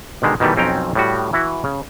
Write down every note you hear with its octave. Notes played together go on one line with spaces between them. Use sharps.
B2 D3 D#3 G#3
B2 D#3 E3 G3 A3
B1 F2 C4 C#4 G5 A#5
A2 G3 F#4
E3 E4 F#4
C#3